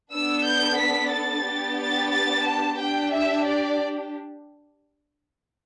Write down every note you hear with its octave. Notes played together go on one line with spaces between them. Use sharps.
B3 D4 A4 E6
G6
B6
A6
B3 D4 G4
A6
A6
A5
D4 G4 G5
E5
D5